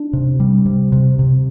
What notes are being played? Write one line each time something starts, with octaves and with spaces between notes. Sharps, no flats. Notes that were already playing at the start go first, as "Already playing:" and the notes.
Already playing: D4
C3
G3
C3
C3
C3